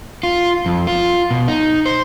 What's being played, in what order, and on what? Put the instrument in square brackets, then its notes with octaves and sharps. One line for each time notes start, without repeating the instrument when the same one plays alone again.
[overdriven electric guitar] F4
F2
F4
B2
D#4
C5